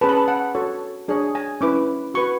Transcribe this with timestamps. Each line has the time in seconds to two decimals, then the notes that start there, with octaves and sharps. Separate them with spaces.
0.01 C#4 G#4 B4 A5
0.09 B5
0.17 A5
0.28 F#5
0.55 F#4 A4 C#5
1.08 D4 G#4 C#5
1.35 G#5
1.61 C#4 E4 B4 D6
2.14 F#4 B4 C#6